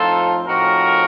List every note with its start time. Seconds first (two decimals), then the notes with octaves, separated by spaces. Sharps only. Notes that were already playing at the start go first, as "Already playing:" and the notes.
Already playing: A2 F3 C4 D#4 F4 A4
0.46 A2 F3 C4 D#4 F#4 A#4